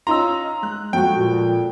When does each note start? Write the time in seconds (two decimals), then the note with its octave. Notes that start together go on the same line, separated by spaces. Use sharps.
0.07 C#4 D#4 F4 A#5 C6 E6
0.63 G#3 F#6
0.93 F2 F#4 G5
1.16 A#2